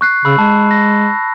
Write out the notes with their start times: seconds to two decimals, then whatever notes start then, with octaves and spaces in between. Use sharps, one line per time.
0.01 C#6 F#6 C7
0.25 C#3 B5 E6
0.38 G#3 A5
0.71 A#6